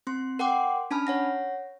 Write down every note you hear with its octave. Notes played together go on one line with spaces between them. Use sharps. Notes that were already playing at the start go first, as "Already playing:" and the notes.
C4 C6
A#4 F#5 G5 C6 D6
C#4 D4 G#5 A5 B5 F6
C#5 F#5 A#6